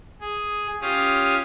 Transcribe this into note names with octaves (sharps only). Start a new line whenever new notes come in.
G#4
C#4 F4 G4 C#5 F5 D#6